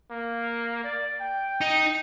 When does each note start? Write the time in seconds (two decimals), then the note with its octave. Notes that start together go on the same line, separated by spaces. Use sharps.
0.11 A#3
0.84 D5
1.21 G5
1.61 D#4